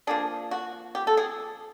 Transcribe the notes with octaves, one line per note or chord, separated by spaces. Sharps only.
F3 A#3 D4 G#4
F#4
G4
A4
G#4